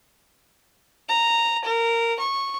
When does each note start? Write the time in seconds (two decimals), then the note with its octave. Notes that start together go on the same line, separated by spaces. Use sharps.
1.09 A#5
1.64 A#4
2.19 C#6